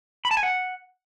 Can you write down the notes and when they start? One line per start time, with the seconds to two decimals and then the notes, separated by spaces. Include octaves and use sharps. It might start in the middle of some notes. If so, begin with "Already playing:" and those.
0.25 B5
0.31 A5
0.37 G#5
0.43 F#5